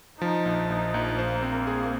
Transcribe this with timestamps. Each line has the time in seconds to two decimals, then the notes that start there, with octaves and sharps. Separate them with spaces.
0.21 F3 D#4
0.45 A#1
0.69 A#1 D#4
0.94 A#1
1.18 A#3 C5
1.42 C4
1.67 G#4